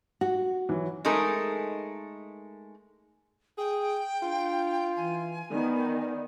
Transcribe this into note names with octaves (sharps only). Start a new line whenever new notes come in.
F#4
E3 F#3
G#3 A3 D#4 A4 A#4
G#4 G5
D4 F4
E3 G#5
D#3 B3 D5